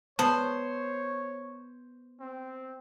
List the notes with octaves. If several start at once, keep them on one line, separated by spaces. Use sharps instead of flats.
B3 C5 C#5 A5
C4